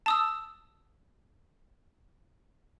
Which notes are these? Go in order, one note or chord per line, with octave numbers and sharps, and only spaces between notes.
A5 D#6 E6